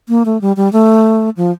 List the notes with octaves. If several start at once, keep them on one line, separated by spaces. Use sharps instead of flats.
A#3
A3
G3
G3
A3
F3